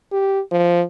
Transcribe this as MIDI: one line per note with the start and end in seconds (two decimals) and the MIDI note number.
0.12 0.40 67
0.51 0.83 53